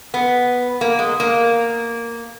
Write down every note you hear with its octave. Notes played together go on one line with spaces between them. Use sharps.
B3
A#3
G#3
A#3